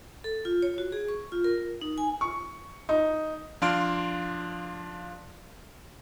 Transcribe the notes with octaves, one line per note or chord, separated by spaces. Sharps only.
A4
F4
C#5
F#4
G#4
C#6
F4
A#4
D#4
G#5
C#6
D#4
F3 D4 F5 C6 F6 D7